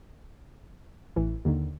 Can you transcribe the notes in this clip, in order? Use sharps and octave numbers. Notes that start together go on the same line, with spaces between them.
A1 E3
D#2 D3 D#3